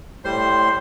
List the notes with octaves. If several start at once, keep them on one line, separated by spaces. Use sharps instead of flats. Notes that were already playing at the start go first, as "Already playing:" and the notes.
A2 G3 C5 C6